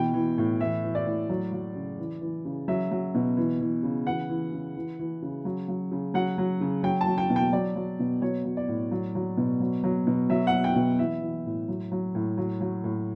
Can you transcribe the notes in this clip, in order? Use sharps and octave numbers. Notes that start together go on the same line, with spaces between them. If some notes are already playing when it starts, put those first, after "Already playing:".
Already playing: B2 E3 G5
E3
A2
E3 E5
E3
D5
A2
F#3
F#3
C#3
E3
E3
C#3
F#3 E5
F#3
B2
E3
E3
C#3
E3 F#5
E3
C#3
E3
E3
C#3
F#3
F#3
C#3
F#3 F#5
F#3
C#3
F#3 G5
A5
F#3
G5
B2
G5
F#3 D5
F#3
B2
F#3 C#5
F#3
D5
A2
F#3
F#3
B2
F#3
F#3
B2
F#3 E5
F#5
F#3
G5
B2
E3 E5
E3
A2
F#3
F#3
A2
F#3
F#3
A2